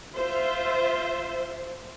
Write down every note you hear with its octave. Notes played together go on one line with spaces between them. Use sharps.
F4 C5 E5